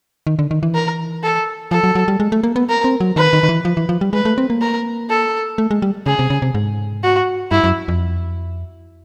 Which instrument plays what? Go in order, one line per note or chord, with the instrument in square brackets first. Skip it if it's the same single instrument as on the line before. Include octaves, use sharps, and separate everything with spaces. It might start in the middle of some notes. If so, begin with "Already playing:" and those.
[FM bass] D#3
D3
D#3
E3
[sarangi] A#4
A4
[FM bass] F3 [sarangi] A4
[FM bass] F#3
F#3
G3
G#3
A3
A#3
B3
[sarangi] A#4
[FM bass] C4
F#3
[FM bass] D#3 [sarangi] B4
[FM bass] D#3
D#3
E3
F3
E3
F3
G3
[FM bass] G#3 [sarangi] B4
[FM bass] A3
C4
A#3
[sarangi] A#4
A4
[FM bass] A3
G#3
G3
[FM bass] C#3 [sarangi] G#4
[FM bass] C3
C#3
C3
G#2
[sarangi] F#4
[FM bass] G2 [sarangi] E4
[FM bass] F#2
F2